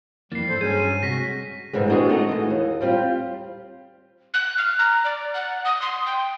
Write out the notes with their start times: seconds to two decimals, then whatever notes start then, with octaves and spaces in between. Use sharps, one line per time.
0.32 F2 E3 G3 A#3 A6 C7
0.49 G#2 A4 C5
0.61 G2 F#3 C#4 G#4 D#7
0.80 D#7
1.03 C3 G#3 F#4 A#6 B6
1.73 G#2 D3 E3 G3 G#3
1.89 G#3 B3 C4 D4 F#4 G#4
2.09 G#3 A3 B3 D#4 D#5
2.28 E3 D#5
2.50 D#2
2.81 G3 C4 F4 G4
4.34 F#6
4.58 F6
4.79 A#5
5.04 D5
5.34 F#5
5.65 D#6
5.82 C6
6.06 G5